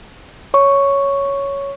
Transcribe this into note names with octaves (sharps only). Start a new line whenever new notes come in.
C#5 C#6